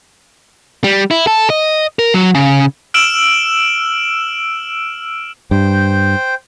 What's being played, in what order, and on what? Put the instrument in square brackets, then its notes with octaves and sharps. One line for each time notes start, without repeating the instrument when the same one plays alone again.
[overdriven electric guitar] G3
E4
A4
D#5
A#4
F#3
C#3
[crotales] E6 F6 D7 E7 F#7
[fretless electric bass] G2 [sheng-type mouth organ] C5 G5